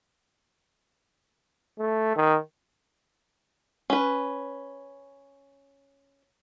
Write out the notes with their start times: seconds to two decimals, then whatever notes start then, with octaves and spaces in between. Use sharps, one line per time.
1.79 A3
2.16 D#3
3.90 C#4 B4